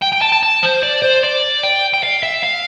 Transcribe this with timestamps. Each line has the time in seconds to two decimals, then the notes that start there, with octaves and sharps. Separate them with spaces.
0.02 G5
0.13 G5
0.22 A5
0.33 A5
0.43 A5
0.63 C5
0.83 D5
1.02 C5
1.23 D5
1.63 G5
1.94 G5
2.03 F5
2.23 E5
2.43 F5